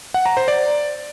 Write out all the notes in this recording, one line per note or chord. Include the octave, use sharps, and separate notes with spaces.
F#5
A#5
C5
D5